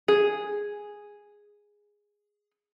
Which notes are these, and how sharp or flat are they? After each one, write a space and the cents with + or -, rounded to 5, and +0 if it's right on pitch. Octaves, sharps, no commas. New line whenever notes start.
G#4 -5